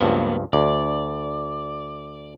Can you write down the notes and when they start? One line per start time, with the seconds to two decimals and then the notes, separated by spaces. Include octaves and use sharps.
0.01 C#2 G2 F3 F#3 A#3 B3
0.53 D2 D5